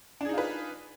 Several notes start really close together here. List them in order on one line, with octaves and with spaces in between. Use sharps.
D4 G#4 D#4 F4 B4